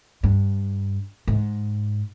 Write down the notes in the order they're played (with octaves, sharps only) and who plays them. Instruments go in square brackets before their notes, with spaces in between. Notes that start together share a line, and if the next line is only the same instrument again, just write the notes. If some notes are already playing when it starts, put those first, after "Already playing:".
[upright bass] G2
G#2